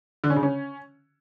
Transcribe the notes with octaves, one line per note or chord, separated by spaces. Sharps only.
D3
C#4
C#3
C#4